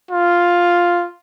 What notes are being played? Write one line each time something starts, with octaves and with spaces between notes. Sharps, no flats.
F4